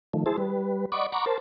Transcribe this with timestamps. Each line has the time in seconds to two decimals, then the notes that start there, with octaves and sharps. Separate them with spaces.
0.14 D#3 F3 A3
0.26 E4 G#4 C5 A5
0.38 G3 B4
0.92 D5 D#5 F#5 B5 C#6 D6
1.12 F#5 A#5 B5 C#6 D6
1.26 A#4 C5 A5